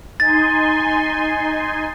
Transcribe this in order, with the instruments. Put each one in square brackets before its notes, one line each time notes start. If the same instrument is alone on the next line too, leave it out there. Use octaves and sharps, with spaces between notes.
[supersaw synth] D#4 G#5 C6 [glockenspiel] A6